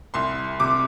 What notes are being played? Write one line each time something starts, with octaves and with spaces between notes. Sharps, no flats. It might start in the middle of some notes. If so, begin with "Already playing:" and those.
C2 C6
C3 D6